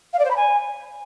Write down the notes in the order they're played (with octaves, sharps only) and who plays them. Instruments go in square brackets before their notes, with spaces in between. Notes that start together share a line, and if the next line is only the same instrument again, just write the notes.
[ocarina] F5
D5
C5
B5
G#5